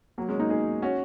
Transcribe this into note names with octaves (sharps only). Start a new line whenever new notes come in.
F#3 A#3
G#3 C#4
A#3 D#4
D#4 G#4
C#4 F#4